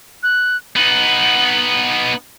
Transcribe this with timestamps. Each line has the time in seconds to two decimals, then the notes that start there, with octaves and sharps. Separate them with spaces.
0.23 F#6
0.76 B3 D#4 F#7